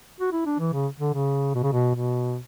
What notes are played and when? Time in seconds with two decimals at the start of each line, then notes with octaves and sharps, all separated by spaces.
0.20 F#4
0.32 E4
0.45 D4
0.59 E3
0.73 C#3
1.00 D3
1.14 C#3
1.55 B2
1.63 C#3
1.72 B2
1.95 B2